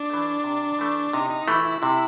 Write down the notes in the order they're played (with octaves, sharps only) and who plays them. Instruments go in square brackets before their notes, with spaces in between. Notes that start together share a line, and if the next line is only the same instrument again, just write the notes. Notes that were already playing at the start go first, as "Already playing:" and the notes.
Already playing: [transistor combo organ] D4
[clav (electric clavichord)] E3 A3
C3
E3 A3
[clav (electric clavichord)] C3 [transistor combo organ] D#4
[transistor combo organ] D#4
[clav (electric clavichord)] E3 A3 [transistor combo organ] E4
[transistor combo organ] E4
[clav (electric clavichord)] C3 [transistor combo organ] E4